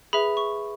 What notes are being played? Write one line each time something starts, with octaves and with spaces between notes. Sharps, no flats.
G#4 B4 E5 B5
C#6